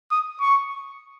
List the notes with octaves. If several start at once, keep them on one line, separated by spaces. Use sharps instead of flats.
D#6
C#6